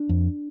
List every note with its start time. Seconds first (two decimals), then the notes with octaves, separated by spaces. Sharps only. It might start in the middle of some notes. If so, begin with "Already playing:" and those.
Already playing: D4
0.09 F2